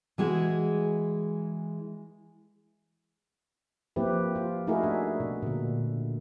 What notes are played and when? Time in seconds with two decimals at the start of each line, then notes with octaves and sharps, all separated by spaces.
0.18 E3 G#3 F#4 G#4
3.96 F3 A#3 C4 E4 G4 B4
4.35 F4
4.67 A3 D#4 E4 F#4 G#4 A#4
4.83 D4 E5
5.20 B2
5.42 A#2 D3